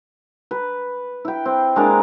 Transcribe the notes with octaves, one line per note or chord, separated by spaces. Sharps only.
B4
E4 G5
C4
G#3 A#3 D4 A#4